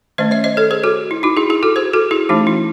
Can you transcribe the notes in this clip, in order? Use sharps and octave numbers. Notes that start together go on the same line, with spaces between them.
D#3 A3 C#4 C5 D#5
C#5 E5
C5 D#5
A4 C#5
G#4 C5
F#4 A4
E4
D#4 F#4
E4 G#4
E4 G#4
F#4 A4
G#4 C5
F#4 A4
E4 G#4
E3 A3 C#4 D#4 F#4
E4